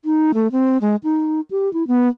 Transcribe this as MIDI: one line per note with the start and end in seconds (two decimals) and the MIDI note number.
0.05 0.32 63
0.34 0.48 57
0.52 0.78 60
0.81 0.96 56
1.04 1.41 63
1.51 1.72 67
1.73 1.87 64
1.88 2.08 59